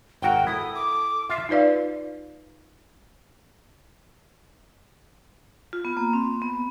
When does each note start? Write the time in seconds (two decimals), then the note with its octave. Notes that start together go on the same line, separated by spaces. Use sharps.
0.22 G#1 F#4 A#4 F#5 G5
0.47 E4 A4 D#6
0.75 D6
1.29 F4 E5 F5
1.49 D#4 F4 B4 D5 F5
5.73 F4
5.85 B3
5.97 A#3
6.13 C4
6.42 B3